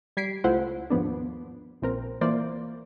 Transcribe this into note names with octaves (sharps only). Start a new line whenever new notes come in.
G3 G#6 B6 C7 D7
C#2 A3 E4 F4 C5 F#5
D#2 G#2 F3 B3 D4
A#1 C4 A#4
E3 A#3 F4 C5 D5